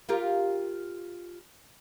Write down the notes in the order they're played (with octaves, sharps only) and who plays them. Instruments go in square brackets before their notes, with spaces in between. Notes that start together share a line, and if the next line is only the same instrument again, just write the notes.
[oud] F4 G4 A#4